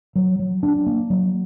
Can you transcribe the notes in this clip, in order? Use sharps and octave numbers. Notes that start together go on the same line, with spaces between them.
F#3
F#3
D4
A#3
F#3